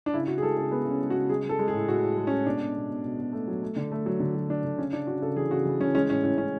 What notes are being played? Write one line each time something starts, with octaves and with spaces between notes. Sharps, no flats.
D4
C#3 E4
C#3 F#4
G#4
G#3 A4
C#3 A4
G#3 B3
C#3
C#4
G#3
F#4
C#3
G#3 G#4
G#3
A4
G#3
G#4
A2
A2 F#4
A2
G#3
C#4
G#3
B2 D4
B2
B2
B2
B2
B2
A3
F#3
A3
D3
A3
F#3
D3
F#3
D3 D4
D3
C#3 C#4
C#3 D4
C#3 F#4
C#3 A4
E3 G#4
C#3 F#4
E3
E3 C#4
G#3 C#4
A2 C#4
A2 C#4
A2 C#4